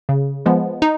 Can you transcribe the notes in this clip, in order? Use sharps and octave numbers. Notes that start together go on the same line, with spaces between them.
C#3
F3 G#3 B3
D#4